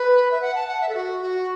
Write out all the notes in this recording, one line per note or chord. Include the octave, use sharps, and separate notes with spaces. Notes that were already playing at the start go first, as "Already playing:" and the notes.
Already playing: B4
E5
F#5
A5
F#5
E5
A4
F#4
F#4